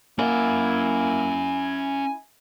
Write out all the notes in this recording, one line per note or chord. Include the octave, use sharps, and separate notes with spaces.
A#3 C#4 E4 F#5 G#5